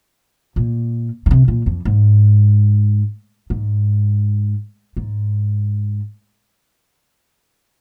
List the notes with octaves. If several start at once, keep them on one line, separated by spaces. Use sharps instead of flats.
A#2
D#3
C3
A#2
F2
G#2
G#2
G#2